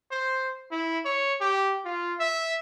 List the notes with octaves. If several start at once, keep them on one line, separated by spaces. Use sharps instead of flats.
C5
E4
C#5
G4
F4
E5